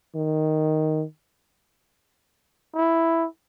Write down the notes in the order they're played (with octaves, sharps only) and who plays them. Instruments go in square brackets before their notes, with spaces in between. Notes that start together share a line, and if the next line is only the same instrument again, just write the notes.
[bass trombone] D#3
[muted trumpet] E4